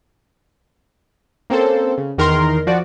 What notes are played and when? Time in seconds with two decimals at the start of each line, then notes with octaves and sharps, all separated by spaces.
1.50 A#3 C4 C#4 A4 C5
1.98 C#3
2.18 E2 D#3 A#4 A#5 C6
2.67 F3 F#4 D5